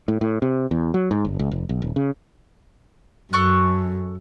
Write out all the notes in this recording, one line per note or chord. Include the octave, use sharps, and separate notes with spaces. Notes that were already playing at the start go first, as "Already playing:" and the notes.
A2
A2
C3
E2
F#3
G#2
G1
C#2
F1
B1
D#1
C#3
F#2 A4 C#6 F#6